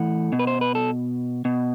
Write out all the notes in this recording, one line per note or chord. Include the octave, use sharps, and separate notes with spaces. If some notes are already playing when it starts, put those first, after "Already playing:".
Already playing: A2 E3 F#5
B2
B4
C5
B4
A4
B2